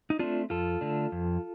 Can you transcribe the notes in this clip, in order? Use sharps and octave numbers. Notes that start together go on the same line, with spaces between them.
D#4
A3 C4 D4 F4
F2 F4 A4
D3 A3 D4
F2